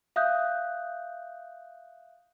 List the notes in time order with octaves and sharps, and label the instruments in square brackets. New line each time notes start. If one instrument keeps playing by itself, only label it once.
[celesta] E5 F5 D#6 F#6 G6